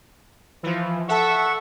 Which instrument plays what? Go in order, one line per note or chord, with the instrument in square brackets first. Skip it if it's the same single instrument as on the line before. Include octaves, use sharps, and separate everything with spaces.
[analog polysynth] E3 F3
[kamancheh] A4 [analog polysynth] E5 [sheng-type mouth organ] F#5 C#6